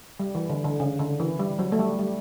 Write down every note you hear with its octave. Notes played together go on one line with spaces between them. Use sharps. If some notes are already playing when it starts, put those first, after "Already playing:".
G3
E3
D3
D3
C#3
D3
E3
G3
F#3
A3
G3
G3